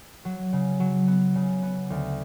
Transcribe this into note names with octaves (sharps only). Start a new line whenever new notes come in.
F#3
C#3
F#3
B3
C#3
B3
D2